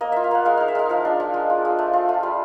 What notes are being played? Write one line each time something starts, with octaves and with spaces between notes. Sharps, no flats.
A#3 D#5
F4 E5
F5
A#3 F#5
G#3 F5
D#4 F5
E5
G#3 F5
F3 F5
D4
F3
G#3
F4
G#3
A3
F4
A3
G3